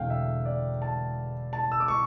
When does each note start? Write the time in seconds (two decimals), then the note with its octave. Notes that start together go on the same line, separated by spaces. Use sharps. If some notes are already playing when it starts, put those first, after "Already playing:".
Already playing: E1 E2 D3 A3 D4 F5 G5
0.10 E5
0.46 D5
0.82 A5
1.53 A5
1.72 E6
1.80 D6
1.88 C#6